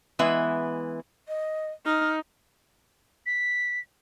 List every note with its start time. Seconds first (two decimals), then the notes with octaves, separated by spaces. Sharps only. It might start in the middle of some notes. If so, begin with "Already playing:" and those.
0.19 E3 G#3 B3 B4 E5
1.28 D#5
1.86 D#4 F6
3.26 B6